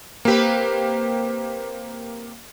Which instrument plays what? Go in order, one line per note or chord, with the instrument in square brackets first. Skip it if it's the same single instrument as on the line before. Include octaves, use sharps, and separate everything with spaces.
[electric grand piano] A#3 G4 [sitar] C4 B4